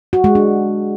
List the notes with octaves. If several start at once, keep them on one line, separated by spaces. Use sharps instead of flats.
F#4
G#3
D4